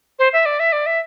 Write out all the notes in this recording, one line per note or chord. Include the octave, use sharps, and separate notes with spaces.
C5
E5
D5
E5
D5
E5